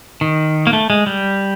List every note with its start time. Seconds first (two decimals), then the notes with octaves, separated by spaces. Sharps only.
0.21 D#3
0.67 A#3
0.73 A3
0.90 G#3
1.07 G3